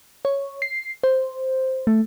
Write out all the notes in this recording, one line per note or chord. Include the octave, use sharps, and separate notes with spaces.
C#5
C7
C5
A3